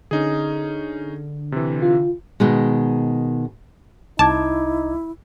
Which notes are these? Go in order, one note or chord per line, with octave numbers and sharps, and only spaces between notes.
D3 C#4 D#4 G#4
C3 E3
F4
B2 D#3 G#3
C2 D#4 E4 A5 D6 G#6